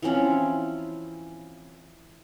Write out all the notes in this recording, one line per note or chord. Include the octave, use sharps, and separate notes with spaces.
E3 F3 C4 C#4